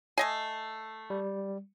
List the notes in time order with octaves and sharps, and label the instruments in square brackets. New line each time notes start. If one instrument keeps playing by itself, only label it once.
[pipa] A3 D#5 G#5 [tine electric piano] C7
[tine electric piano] G3